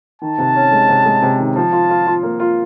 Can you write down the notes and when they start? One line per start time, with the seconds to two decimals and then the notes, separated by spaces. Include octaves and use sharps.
0.22 D#3 A5
0.38 C3
0.56 C#4
0.71 G#3
0.89 C3
1.05 G#3
1.22 C3
1.39 D#3
1.56 F3 A5
1.72 F4
1.90 F4
2.06 F4
2.23 A#3
2.40 F4